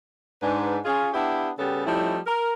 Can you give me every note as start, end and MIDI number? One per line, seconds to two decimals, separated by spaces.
0.42 0.78 44
0.42 0.78 62
0.42 0.78 71
0.85 1.09 61
0.85 1.09 65
0.85 1.09 68
1.13 1.50 59
1.13 1.50 62
1.13 1.50 64
1.13 1.50 67
1.59 1.83 49
1.59 1.83 55
1.59 1.83 59
1.59 1.83 61
1.59 1.83 67
1.59 1.83 69
1.87 2.18 53
1.87 2.18 55
1.87 2.18 57
1.87 2.18 61
1.87 2.18 63
1.87 2.18 64
2.27 2.53 70